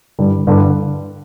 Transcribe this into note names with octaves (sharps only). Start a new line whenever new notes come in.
G2 D3 G3
G2 D3 G3